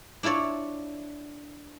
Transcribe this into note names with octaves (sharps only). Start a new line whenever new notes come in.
D4 E4 F4 C#5 D5